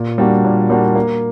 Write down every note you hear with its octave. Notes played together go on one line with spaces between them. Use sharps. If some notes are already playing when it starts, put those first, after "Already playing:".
Already playing: A#2
G3 A#3 D4 F#4
A#2
G3 A#3 D4 F#4
A#3